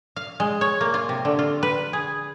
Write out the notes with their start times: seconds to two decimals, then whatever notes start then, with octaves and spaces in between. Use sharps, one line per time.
0.16 F5
0.40 G#3
0.61 C#5
0.81 A#3
0.94 F4
1.09 C3
1.25 D3
1.39 F4
1.63 B4
1.93 G#4